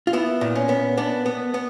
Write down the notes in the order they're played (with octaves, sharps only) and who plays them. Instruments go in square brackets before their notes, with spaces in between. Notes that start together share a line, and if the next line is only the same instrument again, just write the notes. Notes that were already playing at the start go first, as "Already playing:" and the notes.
[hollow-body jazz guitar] F4
B3 E4
A#2
C#4
B3
B3 D4
B3
B3